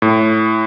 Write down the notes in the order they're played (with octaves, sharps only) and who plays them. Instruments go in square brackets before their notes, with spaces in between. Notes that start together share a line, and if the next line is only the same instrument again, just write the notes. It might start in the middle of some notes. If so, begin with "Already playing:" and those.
[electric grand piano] A2